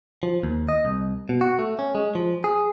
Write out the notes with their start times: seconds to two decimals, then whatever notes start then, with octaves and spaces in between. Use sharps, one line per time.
0.23 F3
0.43 D#2
0.69 D#5
0.85 C2
1.29 B2
1.41 F#4
1.59 A3
1.79 C#4
1.95 G#3
2.15 F3
2.44 G#4